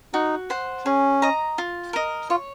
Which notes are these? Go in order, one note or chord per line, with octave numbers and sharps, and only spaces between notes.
D#4 F#4
C5 F#5
C#4 G#4
D#5 A#5
F4
A#4 D#5
F4 C#5